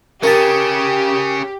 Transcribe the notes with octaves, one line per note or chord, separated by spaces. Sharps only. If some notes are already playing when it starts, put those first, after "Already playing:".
C#4 G4 G#4 A#4 A5